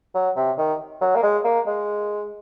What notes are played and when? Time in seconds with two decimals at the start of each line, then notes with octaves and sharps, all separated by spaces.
0.14 F#3
0.36 C3
0.58 D#3
1.01 F#3
1.16 A#3
1.23 G#3
1.44 A#3
1.66 G#3